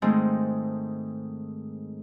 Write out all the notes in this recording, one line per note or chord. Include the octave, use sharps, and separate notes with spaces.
G#2 D#3 G#3 A3 C4 D#4